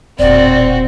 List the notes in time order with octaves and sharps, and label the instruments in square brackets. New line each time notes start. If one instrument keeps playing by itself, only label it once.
[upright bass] E1 A#2 [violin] C4 F#4 [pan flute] D5